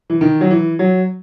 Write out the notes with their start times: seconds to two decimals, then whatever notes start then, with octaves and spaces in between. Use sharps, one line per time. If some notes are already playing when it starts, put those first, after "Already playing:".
0.10 E3
0.21 D#3
0.41 F#3
0.51 E3
0.79 F#3